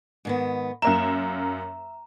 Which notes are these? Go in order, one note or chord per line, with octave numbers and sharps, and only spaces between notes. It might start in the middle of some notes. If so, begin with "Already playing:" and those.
G#2 D#3 B3
F#2 A#3 E5 A#5 E7